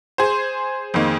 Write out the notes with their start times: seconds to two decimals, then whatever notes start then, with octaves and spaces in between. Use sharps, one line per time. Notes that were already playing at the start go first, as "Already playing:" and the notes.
0.18 G#4 C5
0.94 F2 D#3 A#3